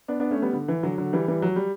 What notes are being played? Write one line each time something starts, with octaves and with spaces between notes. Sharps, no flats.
B3 D4
B3 D4
A3 C#4
G3 B3
D3
E3
D3 F#3
D3 F#3
E3 G3
E3 G3
F#3
G3